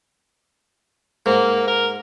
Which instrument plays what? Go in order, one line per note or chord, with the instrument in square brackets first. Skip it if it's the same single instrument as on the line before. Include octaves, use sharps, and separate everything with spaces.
[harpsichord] G#2 [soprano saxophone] A#3
[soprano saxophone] A#4